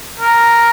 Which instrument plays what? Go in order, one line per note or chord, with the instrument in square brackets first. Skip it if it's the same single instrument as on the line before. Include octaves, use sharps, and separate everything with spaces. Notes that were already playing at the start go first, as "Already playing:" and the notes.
[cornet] A#4